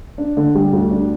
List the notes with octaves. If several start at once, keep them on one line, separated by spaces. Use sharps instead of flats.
D4
D3
G3
D2
D4